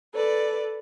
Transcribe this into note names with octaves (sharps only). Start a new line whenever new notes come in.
A4 B4 D5